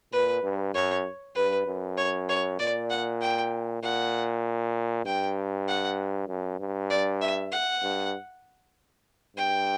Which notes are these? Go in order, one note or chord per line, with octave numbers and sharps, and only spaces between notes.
A#2 B4
G2
F#2 C#5
G2 B4
F#2
C#5
C#5
A#2 D5
F#5
G5
A#2 F#5
G2 G5
F#5
F#2
G2
D5
E5
F#5
G2
G2 G5